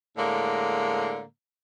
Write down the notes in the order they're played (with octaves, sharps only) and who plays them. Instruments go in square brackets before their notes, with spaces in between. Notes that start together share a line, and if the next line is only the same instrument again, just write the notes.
[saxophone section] A2 D3 G#3 A#3